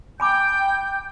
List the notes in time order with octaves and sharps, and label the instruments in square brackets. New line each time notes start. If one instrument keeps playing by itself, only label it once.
[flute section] G5 [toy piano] G#5 B5 D6 [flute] G6